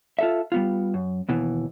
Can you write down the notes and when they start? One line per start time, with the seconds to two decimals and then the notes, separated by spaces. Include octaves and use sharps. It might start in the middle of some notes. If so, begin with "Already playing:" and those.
0.19 F4 A4 E5
0.52 G3 B3 F4
0.94 F#2
1.29 D#2 B2 E3